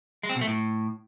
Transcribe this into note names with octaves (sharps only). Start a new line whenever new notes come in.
G#3
C4
B2
A3
A2